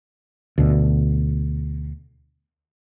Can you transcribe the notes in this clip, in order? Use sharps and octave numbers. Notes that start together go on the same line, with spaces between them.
D2 B2